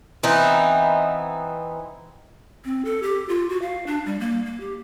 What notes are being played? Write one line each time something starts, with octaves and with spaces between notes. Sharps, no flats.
E3 B3 C4 D#4
C4
A4
G4
F4
F#4
F5
D4
G3
A#3
A#3
G4